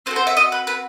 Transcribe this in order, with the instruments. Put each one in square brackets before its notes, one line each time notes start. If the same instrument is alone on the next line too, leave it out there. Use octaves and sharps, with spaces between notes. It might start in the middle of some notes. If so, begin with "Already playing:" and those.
[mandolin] C4 F#4 A4 C5
C5
E5
D#5
B4
B4